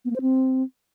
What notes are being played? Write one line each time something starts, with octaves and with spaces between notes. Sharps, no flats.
B3
A#3
C5
C4